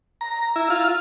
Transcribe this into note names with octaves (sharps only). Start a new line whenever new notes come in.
A#5
E4
F4